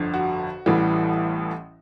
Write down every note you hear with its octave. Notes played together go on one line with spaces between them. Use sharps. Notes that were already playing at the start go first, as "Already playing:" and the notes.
Already playing: G1 F2 D3
F#4
A1 A2 E3 G3